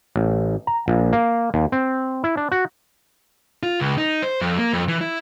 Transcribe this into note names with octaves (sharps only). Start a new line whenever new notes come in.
A1
A#5
A#1
A#3
D#2
C4
E4
D4
F#4
F4
C#2
D#4
C5
F2
A#3
F2
E3
E4